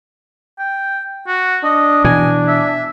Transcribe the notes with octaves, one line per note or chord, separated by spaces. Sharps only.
G5
F#4
D4 D#5
B2 E3 G#5
E5